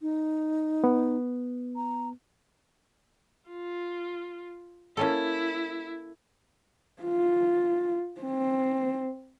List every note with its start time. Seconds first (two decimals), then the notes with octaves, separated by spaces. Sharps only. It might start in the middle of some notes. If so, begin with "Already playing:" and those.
0.01 D#4
0.84 B3
1.76 A#5
3.49 F4
4.97 A#3 C#4 E4 A4
7.03 F4
8.21 C4